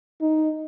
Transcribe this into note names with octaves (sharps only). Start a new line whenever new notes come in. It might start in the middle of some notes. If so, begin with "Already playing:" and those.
D#4